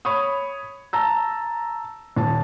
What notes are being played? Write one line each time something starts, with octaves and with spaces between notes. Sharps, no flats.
C#5 B5 C#6 D#6
A5 A#5 E6
D#1 A5